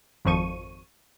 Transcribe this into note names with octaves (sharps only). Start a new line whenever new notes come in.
G#1 F2 F3 C#6 D#7